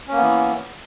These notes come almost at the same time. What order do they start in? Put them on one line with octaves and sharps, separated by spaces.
C#4 A#3 B3 E3